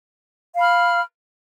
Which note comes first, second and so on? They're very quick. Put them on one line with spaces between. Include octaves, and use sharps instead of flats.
F5 B5 F6